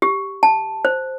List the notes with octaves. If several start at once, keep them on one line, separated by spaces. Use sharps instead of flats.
G4
A5
C5